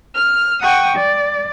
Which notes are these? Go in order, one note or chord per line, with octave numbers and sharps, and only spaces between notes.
F6
F#5 G5 C#6 D#6
D5